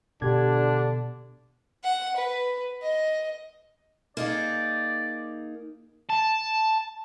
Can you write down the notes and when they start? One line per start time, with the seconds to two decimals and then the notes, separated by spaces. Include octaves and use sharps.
0.22 B2 D3 D4 G4 G#6
1.84 F#5
2.16 B4
2.82 D#5
4.17 A#3 D#4 G#4 D5
6.09 A5